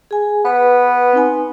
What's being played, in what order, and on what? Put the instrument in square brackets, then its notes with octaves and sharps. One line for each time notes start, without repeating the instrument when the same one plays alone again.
[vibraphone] G#4 G#5
[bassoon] B3 [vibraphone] B4 B5
[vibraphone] C4 D#4 G#5